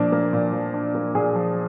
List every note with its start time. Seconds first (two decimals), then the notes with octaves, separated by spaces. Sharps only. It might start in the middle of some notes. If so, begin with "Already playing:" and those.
Already playing: A#2 F3 A#3 D4
0.12 A#3
0.33 A#2
0.53 F3
0.74 D4
0.95 A#3
1.15 A#2 G#4
1.35 F3